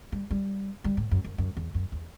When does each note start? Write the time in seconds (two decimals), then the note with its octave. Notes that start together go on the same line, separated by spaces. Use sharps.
0.12 G3
0.31 G3
0.84 G3
0.97 A2
1.11 F#2
1.24 F#2
1.38 F#2
1.57 E2
1.74 F#2
1.92 E2